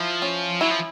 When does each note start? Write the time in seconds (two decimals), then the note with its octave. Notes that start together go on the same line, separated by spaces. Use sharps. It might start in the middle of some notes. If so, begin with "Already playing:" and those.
Already playing: F3 E4
0.22 C#4
0.61 F#3 E4
0.70 F3